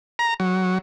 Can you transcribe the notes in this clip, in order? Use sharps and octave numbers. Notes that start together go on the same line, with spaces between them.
A#5
F#3